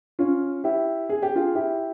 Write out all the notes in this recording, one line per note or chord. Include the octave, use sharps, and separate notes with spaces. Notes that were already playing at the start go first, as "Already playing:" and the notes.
C#4 F4
E4 G4
G#4
G4
F4 G#4
E4 G4